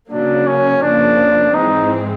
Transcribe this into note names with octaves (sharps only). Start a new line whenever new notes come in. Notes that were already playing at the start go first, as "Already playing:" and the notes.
C#3 F#3 A#3 D4
C#4
F2 C#3 F3 A#3 D4
G#2 E3 G#3 C4 D#4